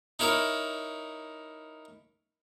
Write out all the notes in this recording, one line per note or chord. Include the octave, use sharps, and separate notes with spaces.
D#4 E4 A#4 C#5 E5